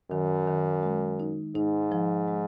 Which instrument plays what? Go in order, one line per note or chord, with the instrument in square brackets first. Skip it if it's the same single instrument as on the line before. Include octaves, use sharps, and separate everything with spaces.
[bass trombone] F#2 [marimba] D#3
[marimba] D#3
G#3
D#4
[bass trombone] G#2 [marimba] D#4
[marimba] F3
G#3